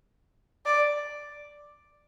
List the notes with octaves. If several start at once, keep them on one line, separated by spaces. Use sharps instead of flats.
D5